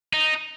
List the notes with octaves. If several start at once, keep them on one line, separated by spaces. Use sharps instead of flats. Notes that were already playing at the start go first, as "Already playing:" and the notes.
D#4